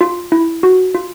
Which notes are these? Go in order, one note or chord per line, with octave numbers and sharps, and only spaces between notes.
F4
E4
F#4
F4